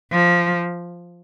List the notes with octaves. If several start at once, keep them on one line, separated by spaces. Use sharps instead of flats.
F3